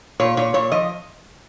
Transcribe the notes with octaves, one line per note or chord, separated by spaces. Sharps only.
A#2 C#5
A#2 C#5
A#2 C#5
F3 D#5